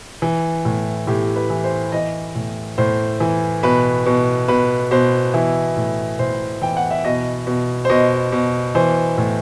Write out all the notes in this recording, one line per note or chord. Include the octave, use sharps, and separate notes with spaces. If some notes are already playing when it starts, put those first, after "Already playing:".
E3
A2
A2 G4
B4
E3
C5
E3 D#5
A2
A2 C5
E3
B2 B4
B2
B2 B4
B2 C5
E3 E4
A2
A2 C5
E3 G5
F#5
E5
B2 D#5
B2
C5
B2 D#5
B2
E3 C5
A2